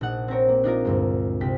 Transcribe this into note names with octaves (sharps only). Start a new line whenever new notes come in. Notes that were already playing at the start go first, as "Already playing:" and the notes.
A#1 D#4 F#5
C4 G4 A#4 C#5
A#3
D4 D#4 F4 A#4
D2 G2 G#3
C2 G4 G5 B6